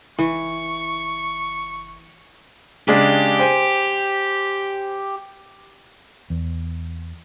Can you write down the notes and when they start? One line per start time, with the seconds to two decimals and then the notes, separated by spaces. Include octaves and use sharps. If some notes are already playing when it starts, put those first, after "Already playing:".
0.19 F#1 E3 C#6
2.88 C#3 G#3 D4 G4
3.39 C5 G5 G#5
6.30 E2